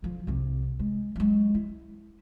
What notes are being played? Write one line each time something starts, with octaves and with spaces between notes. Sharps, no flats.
D3 F3
C2 C3
G#3
F#3 G#3
E4